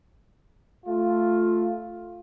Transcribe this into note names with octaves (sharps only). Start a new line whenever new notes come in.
A3 F4